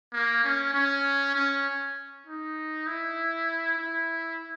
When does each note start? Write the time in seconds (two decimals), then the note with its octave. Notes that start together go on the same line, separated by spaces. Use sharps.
0.13 A#3
0.44 C#4
0.74 C#4
1.35 C#4
2.27 D#4
2.87 E4
3.78 E4